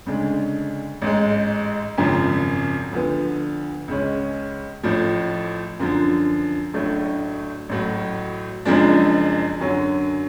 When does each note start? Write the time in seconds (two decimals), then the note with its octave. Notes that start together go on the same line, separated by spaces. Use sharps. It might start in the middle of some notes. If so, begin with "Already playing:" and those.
0.06 D2 C#3 G#3 D4
1.02 A1 G#2 G#3
1.98 G#1 F#2 C#3 F3
2.92 D2 D3 F3 B3
3.88 C#2 C#3 G#3 C#4
4.83 A1 A2 F3
5.79 F#2 D3 F3
6.74 A1 A2 F#3 A3 D4
7.69 A1 A2 F#3
8.65 F#1 F#2 F3 G#3 D4
9.60 F#2 D3 F#3 C#4